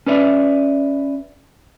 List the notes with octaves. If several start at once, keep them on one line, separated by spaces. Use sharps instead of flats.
C#4 B4 D5 E5